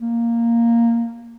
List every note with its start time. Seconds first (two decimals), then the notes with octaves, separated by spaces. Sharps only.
0.01 A#3